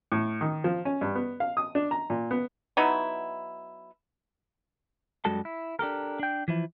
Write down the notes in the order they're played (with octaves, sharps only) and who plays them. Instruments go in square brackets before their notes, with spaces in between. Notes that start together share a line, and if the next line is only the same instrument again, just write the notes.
[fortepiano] A2
D#3
F3
C#4
G2
B3
F5
D#6
D4
A#5
A#2
B3
[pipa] F#3 B3 D#4 E4
[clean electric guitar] F#2 G3 G#3 F#4 A4 A5
E4
D4 G4 A4 A#4
D4 G5
E3 F3 E4